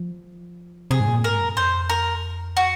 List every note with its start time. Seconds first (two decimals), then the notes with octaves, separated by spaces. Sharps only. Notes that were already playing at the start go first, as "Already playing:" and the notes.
Already playing: F3
0.91 C3 G#4
1.00 G#2
1.07 A#2
1.24 G#2 A#4
1.40 F#2
1.57 F2 C5
1.89 A#4
2.57 F#4